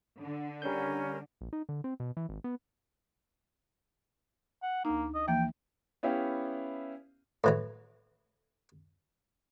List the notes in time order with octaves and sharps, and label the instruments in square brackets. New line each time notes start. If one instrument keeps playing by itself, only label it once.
[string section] D3
[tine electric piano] G3 G6 [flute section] C#4 A#4
[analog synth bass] A#1
D#4
D3
C4
B2
E3
G#1
B3
[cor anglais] F#5
[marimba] D2 D#4 [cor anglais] A#3
[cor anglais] D#5
[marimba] E3 F3 A#3 [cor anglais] G5
[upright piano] B3 C#4 E4 G4 E5 F5
[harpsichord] A2 E3 F#3